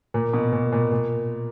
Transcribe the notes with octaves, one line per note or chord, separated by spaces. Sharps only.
A#2
B2
A#2
A#2
A#2